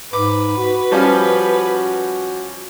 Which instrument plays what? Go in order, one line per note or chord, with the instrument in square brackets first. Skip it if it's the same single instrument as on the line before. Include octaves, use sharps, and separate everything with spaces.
[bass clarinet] G#2 [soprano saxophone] B4 [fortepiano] D6
[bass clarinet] F#4
[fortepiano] F3 G3 C#4